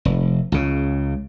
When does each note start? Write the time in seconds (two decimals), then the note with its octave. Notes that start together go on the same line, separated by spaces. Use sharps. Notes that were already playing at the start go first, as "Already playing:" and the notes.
0.05 F1
0.52 C#2 C#3